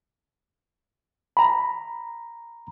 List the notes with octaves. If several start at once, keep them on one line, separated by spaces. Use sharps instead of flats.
A#5 B5